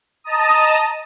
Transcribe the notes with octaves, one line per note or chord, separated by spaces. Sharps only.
D#5 A5 A#5 D#6